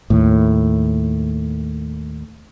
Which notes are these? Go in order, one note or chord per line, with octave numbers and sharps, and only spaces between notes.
D#2 A2